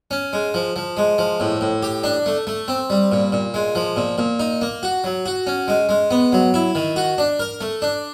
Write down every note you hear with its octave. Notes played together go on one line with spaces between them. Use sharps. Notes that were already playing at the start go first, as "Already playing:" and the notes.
C#4
G#3
F3
F3
G#3
F3
A2
A2
G4
D4
A3
A3
C4
G3
A#2
A#2
G#3
F3
A#2
A#2
D#4
A#3
F#4
F#3
F#4
C#4
G#3
G#3
B3
F#3
E4
D#3
F#4
D4
A#4
A3
D4